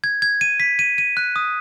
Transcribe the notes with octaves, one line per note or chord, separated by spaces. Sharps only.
G#6
G#6
D#7
B6
D#7
D#7
F#6
D#6